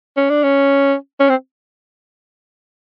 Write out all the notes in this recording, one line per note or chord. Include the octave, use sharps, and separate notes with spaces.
C#4
D4
C#4
C#4
C4